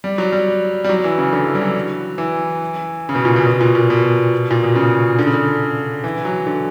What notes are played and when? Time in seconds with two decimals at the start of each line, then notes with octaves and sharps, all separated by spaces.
0.04 G3
0.18 F#3
0.32 G3
0.84 G3
0.89 F#3
1.04 E3
1.18 C#3
1.33 D3
1.47 E3
1.55 G3
1.61 F#3
2.18 E3
3.09 C#3
3.15 B2
3.25 A#2
3.36 B2
3.46 B2
3.61 A#2
3.75 A#2
3.90 B2
4.51 A#2
4.63 B2
4.75 C#3
5.19 D3
5.27 C#3
5.34 D3
6.04 E3
6.25 F#3
6.47 D3